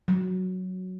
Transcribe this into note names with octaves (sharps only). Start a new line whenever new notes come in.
F#3